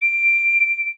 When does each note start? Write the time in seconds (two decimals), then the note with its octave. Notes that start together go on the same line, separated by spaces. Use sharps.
0.02 D7